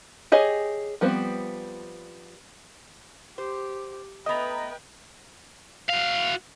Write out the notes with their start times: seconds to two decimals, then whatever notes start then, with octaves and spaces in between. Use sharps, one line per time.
0.32 G4 G#4 C#5 D#5
1.01 F3 G3 B3 C4
3.38 G4 C5
4.26 A3 B3 B4 D#5 G5 A#5
5.90 F#4 F5